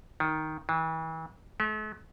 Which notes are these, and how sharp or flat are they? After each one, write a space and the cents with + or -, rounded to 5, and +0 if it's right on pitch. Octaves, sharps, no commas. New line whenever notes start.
D#3 +5
E3 -35
A3 -45